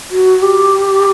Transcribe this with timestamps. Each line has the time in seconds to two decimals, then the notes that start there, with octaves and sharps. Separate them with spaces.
0.11 F#4
0.42 G4